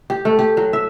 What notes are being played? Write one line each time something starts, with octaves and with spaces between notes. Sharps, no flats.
G4
A3
G4
F#3
E5